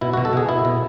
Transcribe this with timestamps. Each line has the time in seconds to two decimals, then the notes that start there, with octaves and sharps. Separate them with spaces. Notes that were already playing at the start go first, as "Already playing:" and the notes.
0.01 B2 E4
0.13 F#4
0.17 B2
0.25 A4
0.33 B2 G#4
0.49 B2 E4
0.65 B2